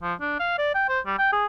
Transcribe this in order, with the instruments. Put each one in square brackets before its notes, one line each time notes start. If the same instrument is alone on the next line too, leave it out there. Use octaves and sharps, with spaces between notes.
[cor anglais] F3
D4
F5
D5
G5
C5
G3
G5
G#4